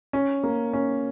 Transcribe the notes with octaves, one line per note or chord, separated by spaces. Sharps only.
C#4
A#3
C#4